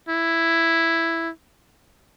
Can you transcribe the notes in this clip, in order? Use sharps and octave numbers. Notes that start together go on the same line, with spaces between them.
E4